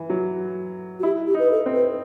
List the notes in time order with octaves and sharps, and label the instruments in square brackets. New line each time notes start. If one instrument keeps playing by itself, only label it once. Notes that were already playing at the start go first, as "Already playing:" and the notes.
Already playing: [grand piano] E3
F#3
[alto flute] F#4
[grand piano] E4 [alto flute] G4
[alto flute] G4
[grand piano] D#4
[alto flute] B4
A4
[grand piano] C4
[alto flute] B4